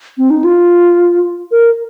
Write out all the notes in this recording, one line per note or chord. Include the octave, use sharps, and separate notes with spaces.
C4
D#4
F4
A#4